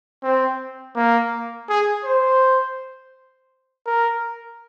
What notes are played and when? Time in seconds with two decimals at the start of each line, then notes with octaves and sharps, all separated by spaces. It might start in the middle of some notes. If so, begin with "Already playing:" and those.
0.23 C4
0.96 A#3
1.69 G#4
2.05 C5
3.86 A#4